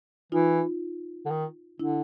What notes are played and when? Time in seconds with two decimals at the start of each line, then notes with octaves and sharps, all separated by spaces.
0.32 E3 D#4 F4
1.26 D3
1.30 D#3
1.80 D3 D4 E4